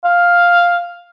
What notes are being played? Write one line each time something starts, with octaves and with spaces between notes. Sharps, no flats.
F5